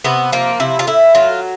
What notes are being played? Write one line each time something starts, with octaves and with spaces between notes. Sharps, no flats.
C3 B3
F3 A#3
C3 E4
F4
A2 E4
F#3 F4